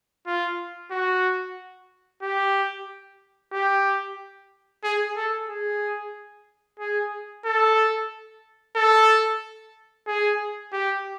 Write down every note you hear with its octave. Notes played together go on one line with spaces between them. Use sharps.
F4
F#4
G4
G4
G#4
A4
G#4
G#4
A4
A4
G#4
G4